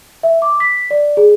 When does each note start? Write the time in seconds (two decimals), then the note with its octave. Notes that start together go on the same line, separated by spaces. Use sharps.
0.23 E5
0.42 D6
0.60 B6
0.91 D5
1.17 G#4